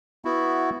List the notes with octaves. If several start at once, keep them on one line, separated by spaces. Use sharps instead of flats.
B3 E4 F#4